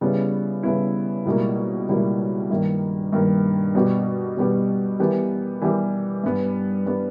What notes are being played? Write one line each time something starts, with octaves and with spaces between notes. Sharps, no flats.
C#3 G3 B3 E4
C#3 G3 B3 E4
C#2 B2 G3 A#3 E4
C#2 B2 G3 A#3 E4
G2 D#3 A#3
G2 D#3 A#3
B2 G3 B3 G4
B2 G3 B3 G4
E3 G3 B3 G4 A#4
E3 G3 B3 G4 A#4
G2 G3 B3
G3 B3